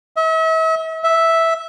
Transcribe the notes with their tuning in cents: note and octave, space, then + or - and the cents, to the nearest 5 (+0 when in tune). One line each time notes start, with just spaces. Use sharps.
E5 -40
E5 -5